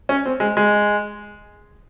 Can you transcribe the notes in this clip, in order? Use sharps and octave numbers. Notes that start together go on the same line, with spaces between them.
C#4
C4
G#3
G#3